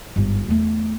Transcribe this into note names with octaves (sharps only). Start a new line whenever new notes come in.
G1 G#2
E2 A3